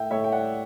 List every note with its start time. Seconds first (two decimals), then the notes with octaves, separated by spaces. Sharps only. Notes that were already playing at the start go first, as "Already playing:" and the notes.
Already playing: A2 E5 G5
0.11 A2 C#5 E5
0.24 G5
0.33 D5 F#5